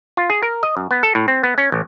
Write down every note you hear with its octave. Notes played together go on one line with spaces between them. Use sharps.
F4
G#4
A#4
D#5
F#2
B3
A4
A2
C4
B3
C#4
A1